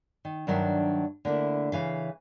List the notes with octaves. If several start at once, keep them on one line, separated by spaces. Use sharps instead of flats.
D#3
G2 D#3 F#3 D4 E5
D3 A3 A#3 E4
C#3 E3 F5